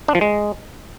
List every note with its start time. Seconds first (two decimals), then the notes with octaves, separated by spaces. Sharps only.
0.08 D4
0.15 F3
0.21 G#3